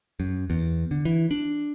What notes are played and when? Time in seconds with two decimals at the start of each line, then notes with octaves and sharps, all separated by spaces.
0.20 F#2
0.50 E2
0.91 D3
1.05 E3
1.31 D4